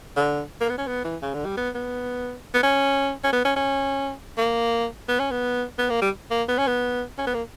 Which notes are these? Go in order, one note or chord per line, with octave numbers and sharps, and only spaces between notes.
D3
A#3
B3
C#4
B3
E3
C#3
D3
G3
B3
B3
B3
C#4
C#4
B3
C#4
C#4
A#3
B3
C#4
B3
B3
A#3
G3
A#3
B3
C#4
B3
C#4
B3
A#3